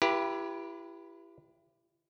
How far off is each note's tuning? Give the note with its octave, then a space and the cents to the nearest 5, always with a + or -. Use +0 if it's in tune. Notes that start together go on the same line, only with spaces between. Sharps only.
E4 +30 G4 +0 B4 -35